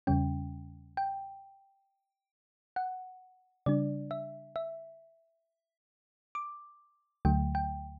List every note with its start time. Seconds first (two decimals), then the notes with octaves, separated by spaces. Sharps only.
0.07 E2 C#3 G3 C#4 G5
0.97 G5
2.76 F#5
3.66 C#3 G3 D4 D5
4.11 E5
4.56 E5
6.35 D6
7.25 D2 D3 F#3 A3 G5
7.55 G5